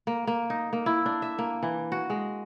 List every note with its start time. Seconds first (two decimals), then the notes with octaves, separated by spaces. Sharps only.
0.07 A#3
0.27 A#3
0.50 D#4
0.73 A#3
0.86 E4
1.06 D4
1.22 E5
1.39 A#3
1.63 E3
1.92 F#4
2.10 G#3